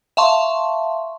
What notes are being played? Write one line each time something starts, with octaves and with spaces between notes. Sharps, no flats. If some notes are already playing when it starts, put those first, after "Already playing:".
E5 F5 A5 C6 C#6